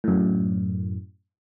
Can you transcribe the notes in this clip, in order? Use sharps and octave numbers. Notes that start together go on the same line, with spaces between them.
F#2 A2